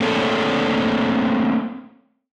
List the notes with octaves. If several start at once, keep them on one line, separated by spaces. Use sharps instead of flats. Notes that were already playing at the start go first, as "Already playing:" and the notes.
A3 A#3 C4 D4 A4 C#5